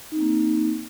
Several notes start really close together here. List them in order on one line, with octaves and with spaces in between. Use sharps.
D#4 C4 A#3